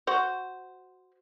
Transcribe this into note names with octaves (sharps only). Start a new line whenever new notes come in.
F#4 C5